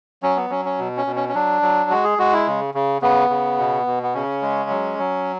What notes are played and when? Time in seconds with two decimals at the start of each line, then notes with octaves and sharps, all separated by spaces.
0.23 F#3 C#4
0.37 B3
0.50 F#3 C#4
0.65 C#4
0.79 B2
0.97 C#4
1.06 B2
1.16 C#4
1.29 C#4
1.34 F#3 D4
1.62 F#3
1.90 G#3 F#4
2.04 G#4
2.18 G#3 F#4
2.33 E4
2.47 C#3
2.74 C#3
3.02 C#3 B3
3.30 C#3
3.58 B2
3.87 B2
4.03 B3
4.15 C#3 C#4
4.42 G#3
4.70 F#3
4.99 F#3